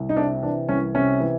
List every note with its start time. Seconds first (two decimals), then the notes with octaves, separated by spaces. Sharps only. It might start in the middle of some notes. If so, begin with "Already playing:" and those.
Already playing: C2
0.09 D#4
0.17 C3 D4
0.43 E3 D4
0.69 C2 C#4
0.95 C3 C#4
1.20 E3